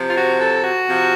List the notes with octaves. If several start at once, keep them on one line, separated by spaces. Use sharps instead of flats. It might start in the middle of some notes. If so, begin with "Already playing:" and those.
Already playing: C3 F3
F4
F#4
A4
F#4
C3 F3